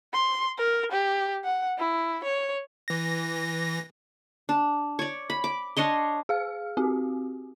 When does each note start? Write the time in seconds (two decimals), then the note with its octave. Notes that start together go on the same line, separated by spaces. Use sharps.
0.14 C6
0.58 A#4
0.92 G4
1.44 F#5
1.78 E4
2.24 C#5
2.88 E3 A#6
4.49 D4
4.99 C#5 D5
5.30 B5
5.44 D6
5.77 D4 C#5 D#5 C6
6.29 G#4 F5 F6
6.77 C4 F#4 G4